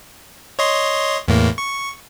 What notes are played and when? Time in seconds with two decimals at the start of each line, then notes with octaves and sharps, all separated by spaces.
0.59 C#5 D#5 C6
1.28 E2 A2 A#3
1.58 C#6